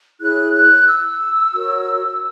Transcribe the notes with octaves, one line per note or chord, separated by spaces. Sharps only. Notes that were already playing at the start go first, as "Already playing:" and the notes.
E4 G#4 C#5 F#6
F#6
E6
F#4 A#4 C#5